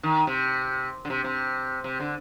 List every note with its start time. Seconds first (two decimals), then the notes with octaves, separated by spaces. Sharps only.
0.03 D#3
0.27 C3
1.05 D3
1.10 C3
1.24 C3
1.84 C3
2.00 D3